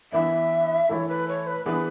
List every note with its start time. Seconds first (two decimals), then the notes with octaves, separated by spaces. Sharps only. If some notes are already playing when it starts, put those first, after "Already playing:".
0.12 E3 B3 D4 E5
0.89 E3 A3 E4 A4 C#5 E5
1.09 B4
1.28 C#5
1.47 B4
1.66 E3 B3 D4 G#4 B4